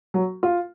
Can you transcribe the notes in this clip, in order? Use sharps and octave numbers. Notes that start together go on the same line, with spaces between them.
F#3
F4